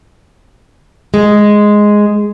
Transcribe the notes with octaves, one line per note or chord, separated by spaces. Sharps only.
G#3